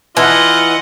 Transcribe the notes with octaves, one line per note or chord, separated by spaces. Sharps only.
E3 F4 D#5 F#5